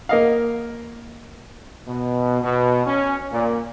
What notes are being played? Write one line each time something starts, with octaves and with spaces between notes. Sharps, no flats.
A#3 D#5 F5
B2
B2
C#4
A#2